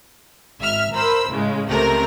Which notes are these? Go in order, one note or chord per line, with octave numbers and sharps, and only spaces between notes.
G#1 E5 F6
A#4 C5 B5 E6
A2 C#3 G#3
C#2 C3 A3 A#4 A#6